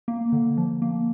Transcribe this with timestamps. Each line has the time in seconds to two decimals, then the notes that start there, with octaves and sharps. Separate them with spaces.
0.08 A#3
0.32 D3
0.57 F3
0.82 A#3